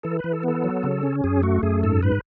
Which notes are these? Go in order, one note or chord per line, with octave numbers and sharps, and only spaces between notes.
E3 A4
E3 B4
A4
B3 A4
F#3
C#3
C#4
F#2 G#4
A3 F#4
F#2 G#4
G#2 A4
G#2 B4